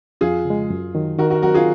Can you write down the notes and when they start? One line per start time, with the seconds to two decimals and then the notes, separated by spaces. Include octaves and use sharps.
0.21 F2 F4 G#4
0.45 C#3
0.50 G#3
0.70 F#2
0.95 D#3 F#3
1.18 D#3 F#4 A#4
1.30 F#4 A#4
1.42 F#3 C4 D#4 F#4 A#4
1.54 F4 G#4